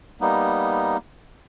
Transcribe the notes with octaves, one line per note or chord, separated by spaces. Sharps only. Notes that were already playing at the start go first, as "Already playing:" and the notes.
G3 A#3 B3 D#4